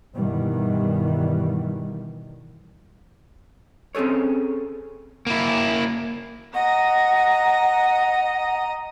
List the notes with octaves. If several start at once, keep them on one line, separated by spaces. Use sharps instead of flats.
G2 B2 D#3 E3 G3
C4 C#4 G#4 A4 C#5
A#3 E4
D#5 F#5 A#5